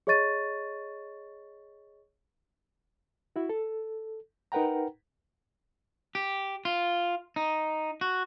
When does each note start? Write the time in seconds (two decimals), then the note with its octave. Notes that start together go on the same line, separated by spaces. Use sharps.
0.07 G#4 C#5 D#5 C#6 A6 D#7
3.36 E4 F#4
3.49 A4
4.52 D#4 A#4 B4 F#5 G5 A#5
6.15 G4
6.65 F4
7.36 D#4
8.01 F#4